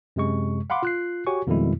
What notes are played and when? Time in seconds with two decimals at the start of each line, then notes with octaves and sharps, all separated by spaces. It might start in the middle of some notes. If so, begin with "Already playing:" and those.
0.16 F#2 C3 G#3 C#6
0.70 F5 F#5 B5 C6 D6
0.83 F4 F#6 C7
1.27 F#4 G4 C#5 G#5 C#6
1.47 F2 B2 D#3 G3 G#3 E4